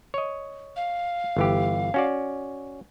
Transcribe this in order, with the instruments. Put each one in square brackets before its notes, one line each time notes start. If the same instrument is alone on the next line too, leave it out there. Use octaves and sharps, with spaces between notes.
[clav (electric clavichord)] C#5 D#5
[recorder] F5
[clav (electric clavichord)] G1 E3 G4
C#4 F#4 D5